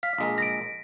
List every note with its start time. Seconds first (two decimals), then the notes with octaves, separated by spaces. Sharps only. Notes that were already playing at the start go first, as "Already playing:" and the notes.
0.03 F5 B6
0.18 A#1 G#3 A#4
0.38 A#6 D7